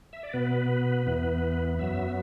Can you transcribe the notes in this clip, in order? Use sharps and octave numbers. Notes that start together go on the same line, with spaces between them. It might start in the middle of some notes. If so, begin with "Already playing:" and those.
E5
D5
B2 B3 B4
E2 E3 B3
F#2 F#3 B3 E5